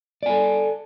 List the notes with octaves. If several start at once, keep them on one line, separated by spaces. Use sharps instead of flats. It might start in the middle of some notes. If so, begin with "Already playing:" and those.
A4 D5 G#5